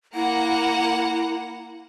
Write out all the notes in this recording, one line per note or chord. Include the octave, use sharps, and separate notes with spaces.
A#3 E4 F#5 A#5